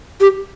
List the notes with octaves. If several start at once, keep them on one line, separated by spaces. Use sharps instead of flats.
G4